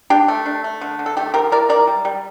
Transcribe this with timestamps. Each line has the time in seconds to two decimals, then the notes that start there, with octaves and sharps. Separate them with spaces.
0.10 D4 G4
0.28 A3
0.46 D4
0.64 A3
0.81 D3
0.99 D3
1.06 A4
1.17 A3 G4
1.34 F3 G4 A#4
1.52 E4 A#4 D5
1.69 G3 A#4 D5
1.87 G3
2.05 G3